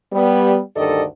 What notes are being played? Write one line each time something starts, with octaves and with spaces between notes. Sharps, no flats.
G3 B3
D2 G2 D#3 A4 D5 D#5